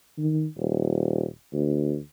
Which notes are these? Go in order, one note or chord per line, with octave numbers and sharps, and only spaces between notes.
D#3
D#1
D2